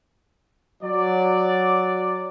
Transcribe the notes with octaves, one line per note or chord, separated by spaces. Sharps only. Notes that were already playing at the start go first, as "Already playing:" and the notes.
F#3 D5